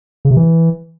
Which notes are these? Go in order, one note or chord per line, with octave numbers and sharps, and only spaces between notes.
C#3
C3
E3